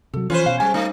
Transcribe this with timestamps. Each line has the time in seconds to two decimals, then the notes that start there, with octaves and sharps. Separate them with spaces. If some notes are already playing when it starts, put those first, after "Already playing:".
0.14 C3 F#3 A4
0.30 E3 F3 C#4 F4 B4 C5
0.46 B2 F5
0.60 G3 G#3 G#5
0.74 A3 D#4